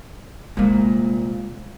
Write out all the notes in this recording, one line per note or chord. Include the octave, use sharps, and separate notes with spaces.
C2 A#2 G#3 A#3